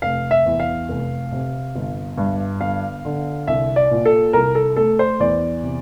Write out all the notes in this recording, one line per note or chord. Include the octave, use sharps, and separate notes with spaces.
F1 F5
E5
E2
F5
F1
C3
G1
G2
G1 F5
D3
C2 E5
D5
A#2
A4
C2 A#4
A4
A3 A4
C5
E2 D5
C3